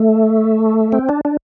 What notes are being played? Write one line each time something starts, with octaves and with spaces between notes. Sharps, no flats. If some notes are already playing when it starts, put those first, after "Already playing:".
Already playing: A3
C4
D4
D4